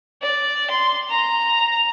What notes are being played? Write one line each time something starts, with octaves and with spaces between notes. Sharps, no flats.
D5
C6
A#5